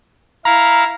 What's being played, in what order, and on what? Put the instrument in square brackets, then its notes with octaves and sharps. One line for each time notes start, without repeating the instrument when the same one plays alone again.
[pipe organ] E4 F5 [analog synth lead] A#5